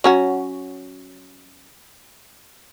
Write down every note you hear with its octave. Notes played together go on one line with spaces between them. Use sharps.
F#3 C#4 F#4